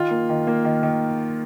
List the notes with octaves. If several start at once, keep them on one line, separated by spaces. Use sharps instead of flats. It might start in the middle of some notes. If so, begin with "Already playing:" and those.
Already playing: D#3 F4
A#3
D#3
A#3
D#3
D#3